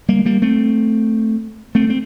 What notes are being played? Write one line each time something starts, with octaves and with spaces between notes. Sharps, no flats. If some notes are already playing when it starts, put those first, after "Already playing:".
G3 A#3
G3 A#3
A3 C4
A3 C4
C4